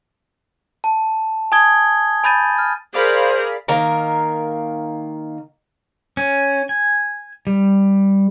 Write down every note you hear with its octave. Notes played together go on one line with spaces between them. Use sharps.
A5
G#5 A5 D#6 G#6 G7
G#5 B5 G6 A6 D#7
F6
G#4 A#4 C5 D5 F5 B5
D#3 A#3 A#4
C#4
G#5
G3